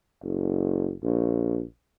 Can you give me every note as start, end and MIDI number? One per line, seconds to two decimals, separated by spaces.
0.24 0.94 30
1.03 1.63 34